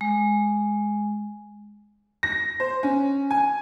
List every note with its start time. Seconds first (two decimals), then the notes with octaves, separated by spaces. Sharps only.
0.01 G#3
2.23 A#6
2.60 C5
2.83 C#4
3.31 G#5